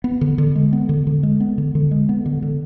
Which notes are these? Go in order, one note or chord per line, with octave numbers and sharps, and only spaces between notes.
B3
D3
D3
G#3
B3
D3
D3
G#3
B3
D3
D3
G#3
B3
D3
D3